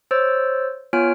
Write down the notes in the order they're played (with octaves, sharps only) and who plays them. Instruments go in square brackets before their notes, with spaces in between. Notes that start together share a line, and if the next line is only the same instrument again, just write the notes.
[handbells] C5 C#5 E6 A6
B3 F4 C#5 G#5 F6 D7